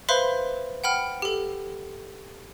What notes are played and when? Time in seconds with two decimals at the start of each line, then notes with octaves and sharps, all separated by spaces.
0.09 B4 C5 E5 F5 B5 C6
0.84 F#5 G5 B5 F6
1.22 G4 A4